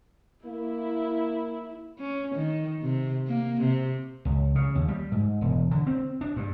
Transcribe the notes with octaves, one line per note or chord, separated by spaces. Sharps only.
A#3 E4
C#4
D#3
C3
A#3
C3
C#2
C#3
D#2
G3
G#2
E1
D3
C4
D4
G2